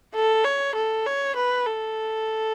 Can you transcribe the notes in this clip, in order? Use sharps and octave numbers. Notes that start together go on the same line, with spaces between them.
A4
C#5
A4
C#5
B4
A4